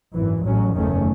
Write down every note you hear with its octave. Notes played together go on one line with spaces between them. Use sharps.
G#1 F#2 E3
A1 A2 F#3 C#4
F#1 E2 D#3 A3 C#4